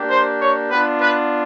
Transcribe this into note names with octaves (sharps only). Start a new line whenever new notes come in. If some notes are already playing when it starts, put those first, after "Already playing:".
Already playing: A#3 D4 G4
C5
C#5
B3 D4 F4 B4
B4